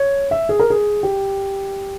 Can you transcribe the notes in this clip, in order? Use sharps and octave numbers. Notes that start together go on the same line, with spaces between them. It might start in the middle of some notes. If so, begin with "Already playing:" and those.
Already playing: C#5
E5
G#4
A#4
G#4
G4